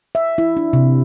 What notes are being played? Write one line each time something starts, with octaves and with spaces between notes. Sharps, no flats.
E5
E4
D4
C3